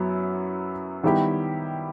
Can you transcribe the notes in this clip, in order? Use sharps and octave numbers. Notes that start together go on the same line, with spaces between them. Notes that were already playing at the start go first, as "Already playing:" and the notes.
Already playing: F#2 F#3 B3 E4
D#3 G3 B3 E4 G4